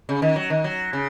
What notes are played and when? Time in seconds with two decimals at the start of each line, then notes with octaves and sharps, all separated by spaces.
0.09 C#3
0.22 D#3
0.36 F#3
0.50 D#3
0.64 F#3
0.93 C#3